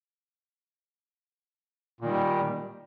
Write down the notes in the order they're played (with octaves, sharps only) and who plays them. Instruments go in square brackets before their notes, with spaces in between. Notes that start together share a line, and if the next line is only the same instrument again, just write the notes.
[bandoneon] A#2
D#3
G3